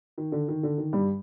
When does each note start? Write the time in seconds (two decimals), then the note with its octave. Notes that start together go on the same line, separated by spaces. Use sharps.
0.18 D#3
0.32 D3
0.48 D#3
0.63 D3
0.78 D#3
0.93 G2 G3